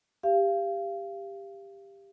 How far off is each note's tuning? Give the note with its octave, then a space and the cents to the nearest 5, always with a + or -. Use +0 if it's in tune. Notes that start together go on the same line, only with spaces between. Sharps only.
G4 +15 F5 -25